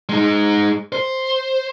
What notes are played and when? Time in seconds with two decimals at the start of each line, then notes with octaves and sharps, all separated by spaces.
0.09 G#3 D#4
0.92 C5